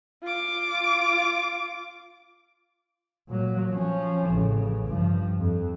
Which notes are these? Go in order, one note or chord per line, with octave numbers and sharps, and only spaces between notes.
F4 D6
A#2 F#3
F3 C#4
A1 C#3
G2 F3
F2